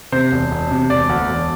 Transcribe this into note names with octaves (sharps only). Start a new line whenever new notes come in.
C3 C5
E1
E1
C3
E1 D5
D2
E1